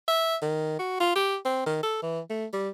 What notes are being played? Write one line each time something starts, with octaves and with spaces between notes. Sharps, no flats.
E5
D#3
F#4
F4
G4
C4
D#3
A4
E3
A3
G3